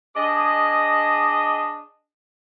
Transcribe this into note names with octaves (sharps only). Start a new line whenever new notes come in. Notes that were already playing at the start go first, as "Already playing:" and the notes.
D4 G#4 D5 D#5